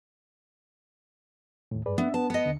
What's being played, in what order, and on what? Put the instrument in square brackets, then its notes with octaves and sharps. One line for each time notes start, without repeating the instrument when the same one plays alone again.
[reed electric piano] D#2 A2
[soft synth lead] G2 [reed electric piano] G#4 B4 D5
[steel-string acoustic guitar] B3 [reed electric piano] D4 [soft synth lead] E5
[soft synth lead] B3 [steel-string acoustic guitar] A5
[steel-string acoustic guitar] B3 D#5 [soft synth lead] C#7
[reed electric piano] D#2 D3